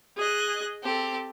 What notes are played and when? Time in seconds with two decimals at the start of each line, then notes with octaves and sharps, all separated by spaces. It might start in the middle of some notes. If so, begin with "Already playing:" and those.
0.17 G#4 D#5 F#6
0.83 C4 G4 A4